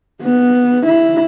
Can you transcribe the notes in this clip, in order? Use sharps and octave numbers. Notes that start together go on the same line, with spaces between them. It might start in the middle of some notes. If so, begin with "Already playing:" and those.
B3
E4